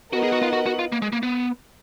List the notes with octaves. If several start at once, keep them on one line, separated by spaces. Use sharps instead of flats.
B3 D#4 F#4 A#4 D#5 F#5
G#4
F#4
F4
F#4
F#4
F4
A#3
G#3
A#3
B3